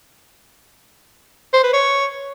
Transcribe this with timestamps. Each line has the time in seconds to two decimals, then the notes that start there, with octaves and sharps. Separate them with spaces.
1.53 C5
1.63 B4
1.73 C#5